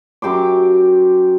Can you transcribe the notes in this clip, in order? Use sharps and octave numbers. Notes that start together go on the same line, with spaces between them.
F#2 G4 C6 D6